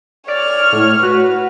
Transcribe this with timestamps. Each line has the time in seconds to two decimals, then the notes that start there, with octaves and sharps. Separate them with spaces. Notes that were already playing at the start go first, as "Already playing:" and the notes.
0.28 C#5 D5 F6
0.73 A2
1.03 F#4 B4